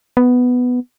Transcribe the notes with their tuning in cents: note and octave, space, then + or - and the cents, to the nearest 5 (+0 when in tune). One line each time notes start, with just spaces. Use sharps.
B3 +5